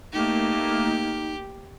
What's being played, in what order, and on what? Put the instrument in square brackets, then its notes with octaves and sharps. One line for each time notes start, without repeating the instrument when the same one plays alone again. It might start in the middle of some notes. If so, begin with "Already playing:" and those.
[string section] A3 A#3 [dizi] D#4 [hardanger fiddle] G4